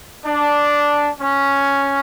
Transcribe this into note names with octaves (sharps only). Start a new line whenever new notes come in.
D4
C#4